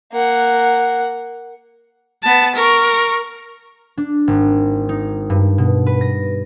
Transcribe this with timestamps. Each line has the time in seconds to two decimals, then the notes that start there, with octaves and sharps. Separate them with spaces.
0.12 A#3 F#5
2.23 B3 A5
2.55 A#4 C#6
3.97 D4
4.27 G#1
4.89 D#4
5.30 G2
5.58 B2
5.86 B4
6.01 A#6